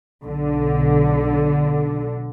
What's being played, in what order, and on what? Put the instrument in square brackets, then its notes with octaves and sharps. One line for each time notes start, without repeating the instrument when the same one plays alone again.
[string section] B1 D3